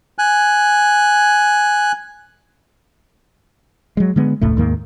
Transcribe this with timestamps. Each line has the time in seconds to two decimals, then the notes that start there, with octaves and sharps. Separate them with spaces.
0.18 G#5 F#6
3.97 F#3 G#3
4.16 D3 G#3 B3
4.41 F1 C#2 A2 A3
4.57 D#2 G#2 D#3 A#3